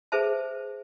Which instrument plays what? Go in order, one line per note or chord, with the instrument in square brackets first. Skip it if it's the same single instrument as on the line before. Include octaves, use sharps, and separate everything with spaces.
[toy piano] G#4 B4 C5 E5 A5